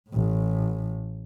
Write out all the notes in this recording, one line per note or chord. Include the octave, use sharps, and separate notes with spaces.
A1 A2